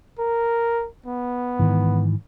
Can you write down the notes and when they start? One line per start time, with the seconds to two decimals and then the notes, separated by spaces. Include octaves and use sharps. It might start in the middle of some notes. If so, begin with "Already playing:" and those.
0.19 A#4
1.06 B3
1.59 G#2 D#3 E3